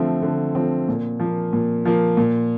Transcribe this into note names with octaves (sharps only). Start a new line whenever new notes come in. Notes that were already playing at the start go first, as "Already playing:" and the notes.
Already playing: D3 F3 A3 C4
D3
F3 A3 C4
A#2
F3
A#3
A#2
F3 A#3
A#2